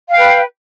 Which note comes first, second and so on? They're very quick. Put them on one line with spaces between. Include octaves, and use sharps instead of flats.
F5 G5 B4